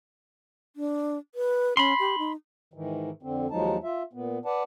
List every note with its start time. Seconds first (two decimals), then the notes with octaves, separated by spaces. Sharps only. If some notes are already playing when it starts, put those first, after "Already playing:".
0.76 D4
1.35 B4
1.77 C#4 B5 C6
1.99 G4
2.18 D#4
2.74 G#2 D#3 E3
3.23 F2 D3 C4
3.50 D#2 F3 F#3 G#3 D#4 A5
3.84 F4 E5
4.13 A#2 B3
4.45 B4 D5 F#5 A5